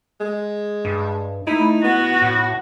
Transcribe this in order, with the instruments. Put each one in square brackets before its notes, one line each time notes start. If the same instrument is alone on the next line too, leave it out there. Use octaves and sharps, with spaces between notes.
[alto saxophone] G#3
[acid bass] G2
[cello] A3 [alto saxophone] D#4 [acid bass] E4
[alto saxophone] B3 [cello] F#4
[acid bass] A2